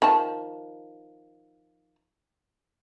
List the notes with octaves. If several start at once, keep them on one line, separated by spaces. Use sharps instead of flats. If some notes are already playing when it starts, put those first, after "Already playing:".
D#3 F3 A5